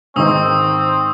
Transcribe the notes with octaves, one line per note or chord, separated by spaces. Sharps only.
G#2 D#3 C4 D#4 C#6 D#6 E6